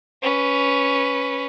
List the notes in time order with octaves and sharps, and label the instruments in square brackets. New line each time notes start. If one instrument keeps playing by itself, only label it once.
[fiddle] C#4 B4